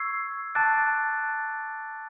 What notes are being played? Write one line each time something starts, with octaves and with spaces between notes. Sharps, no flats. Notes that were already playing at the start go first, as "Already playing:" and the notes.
Already playing: C#6 E6 G#6 C7
A5 D6 F#6 A6 D7